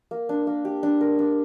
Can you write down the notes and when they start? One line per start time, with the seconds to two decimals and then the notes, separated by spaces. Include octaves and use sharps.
0.11 A#3
0.29 D4
0.47 A#3
0.65 G4
0.83 D4
1.01 A#4
1.19 D4